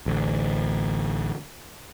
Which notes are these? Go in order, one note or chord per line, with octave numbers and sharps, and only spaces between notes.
A1 D2